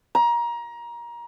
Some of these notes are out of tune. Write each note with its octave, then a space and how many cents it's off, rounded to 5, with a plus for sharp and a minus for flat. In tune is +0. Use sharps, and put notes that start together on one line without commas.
A#5 +25